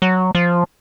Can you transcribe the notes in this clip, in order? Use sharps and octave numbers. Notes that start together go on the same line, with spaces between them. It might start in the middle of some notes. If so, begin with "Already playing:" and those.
F#3
F3